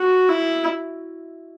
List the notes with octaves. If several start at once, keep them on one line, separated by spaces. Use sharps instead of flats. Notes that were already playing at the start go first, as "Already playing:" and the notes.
Already playing: F#4
E4